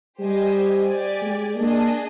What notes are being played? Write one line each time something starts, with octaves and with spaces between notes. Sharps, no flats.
G3 G4 C5 D#5 G#5
G4 D5 G#5
G#3
A#3 D4 G#4 D#5